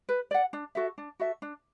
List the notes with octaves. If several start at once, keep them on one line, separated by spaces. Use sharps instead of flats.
B4
D5 F#5
D4
F#4 A4 E5
D4
F#4 A4 E5
D4